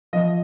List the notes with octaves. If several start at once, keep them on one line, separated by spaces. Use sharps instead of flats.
F3 D#5